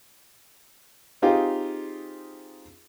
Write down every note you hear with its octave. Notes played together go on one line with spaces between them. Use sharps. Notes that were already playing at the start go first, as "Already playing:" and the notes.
C4 D#4 F4 G4 G#4 F5